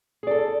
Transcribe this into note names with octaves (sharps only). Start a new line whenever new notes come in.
G#4 A4 D5